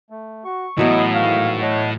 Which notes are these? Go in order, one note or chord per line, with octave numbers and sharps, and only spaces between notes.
A3
F#4 C#6
A2 E3 F#3 B3 D#5
G#2 D#3 F#4 F5
A4 C#5 D#5 F#5